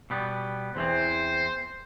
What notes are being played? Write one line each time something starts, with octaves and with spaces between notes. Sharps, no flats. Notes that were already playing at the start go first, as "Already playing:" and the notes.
B2 G3 B3
E2 E3 C4 C5